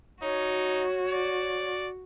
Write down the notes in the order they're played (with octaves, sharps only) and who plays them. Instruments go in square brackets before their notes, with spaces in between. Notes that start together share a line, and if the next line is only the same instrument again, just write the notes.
[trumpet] D#4 [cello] F#4 [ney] C#5
[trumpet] D5